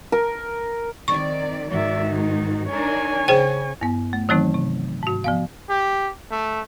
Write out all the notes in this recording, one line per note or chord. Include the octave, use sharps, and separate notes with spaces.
A#4
D#3 C4 D5 C#6
G#2 D#3 F#4 D5 E5
D#4
D4 D#4 A#4 C#5 G#5
C#3 G#4 C5 G5
G2 B3
A3
D#3 E3 F#3 A3 C4 D#4
C3
G#2 F#4
F3 B3 F5
G4
A3